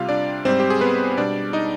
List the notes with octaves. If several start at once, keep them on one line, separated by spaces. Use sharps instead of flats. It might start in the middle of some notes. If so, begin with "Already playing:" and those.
Already playing: C3 G3 F4 F5
D4 D5
G#2 G3 C4 C5
G4
G#4
B3 B4
B2 G3 D4 D5
D#4 D#5